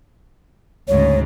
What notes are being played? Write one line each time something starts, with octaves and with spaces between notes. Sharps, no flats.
D2 G#2 C#3 C#5